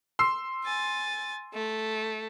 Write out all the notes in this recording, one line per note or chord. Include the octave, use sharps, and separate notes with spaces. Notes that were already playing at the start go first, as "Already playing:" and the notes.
C6 E6 C7
G#5 A6
A3